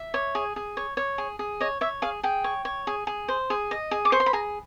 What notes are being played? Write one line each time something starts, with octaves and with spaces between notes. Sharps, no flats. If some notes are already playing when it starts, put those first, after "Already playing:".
Already playing: E5
C#5
G#4
G#4
C#5
C#5
G#4
G#4
C#5 D#5
C#5 E5
G#4 F5
G#4 G5
C#5
C#5
G#4
G#4
C5
G#4
D#5
G#4
D6
C5 C#6
C6
B5
G#4 A#5